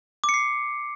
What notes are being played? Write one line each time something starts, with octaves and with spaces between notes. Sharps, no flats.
D6
C#7
C7